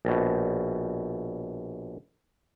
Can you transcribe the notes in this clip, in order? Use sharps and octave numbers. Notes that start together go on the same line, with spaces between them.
A#1 B2